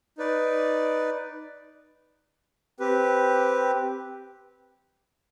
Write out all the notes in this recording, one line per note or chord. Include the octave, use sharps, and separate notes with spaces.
D#4 B4 D5
C4 G4 B4